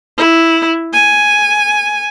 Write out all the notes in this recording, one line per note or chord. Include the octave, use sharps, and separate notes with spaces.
E4
G#5